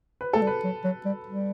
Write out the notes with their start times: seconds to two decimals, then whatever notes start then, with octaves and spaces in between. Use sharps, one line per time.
0.21 B4
0.33 A3 A4
0.42 G3
0.47 B4
0.64 F#3
0.84 F#3
1.05 G3
1.27 G3